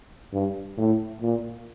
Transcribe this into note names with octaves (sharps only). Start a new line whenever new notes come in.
G2
A2
A#2